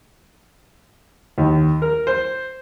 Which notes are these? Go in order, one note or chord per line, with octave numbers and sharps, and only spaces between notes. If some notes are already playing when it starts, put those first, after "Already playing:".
D#2
A#4
C5